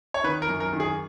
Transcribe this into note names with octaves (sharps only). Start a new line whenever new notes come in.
C#5
D#3 B4
A#4
F#2
A#4
D#3
G#4